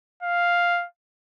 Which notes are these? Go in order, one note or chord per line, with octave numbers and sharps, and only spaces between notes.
F5